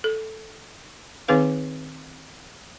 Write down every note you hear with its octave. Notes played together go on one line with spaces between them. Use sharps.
A4
D#3 C4 D#4 G#4 B4 F5